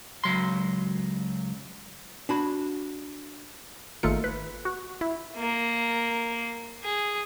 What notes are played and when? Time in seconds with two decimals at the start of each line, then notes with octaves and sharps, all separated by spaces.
0.24 C#2 F#3 C6
2.29 D4 F#4 B5
4.03 G#1 D#3 A3 A#3 F4 C#7
4.24 B4
4.65 F#4
5.01 E4
5.36 A#3
6.84 G#4